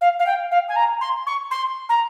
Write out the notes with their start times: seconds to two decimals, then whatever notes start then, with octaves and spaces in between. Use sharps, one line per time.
0.01 F5
0.19 F5
0.26 G5
0.51 F5
0.68 G#5
0.76 A#5
1.01 C6
1.26 C#6
1.51 C6
1.89 A#5